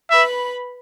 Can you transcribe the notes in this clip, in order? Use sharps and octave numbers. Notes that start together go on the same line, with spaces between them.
B4 E5 B5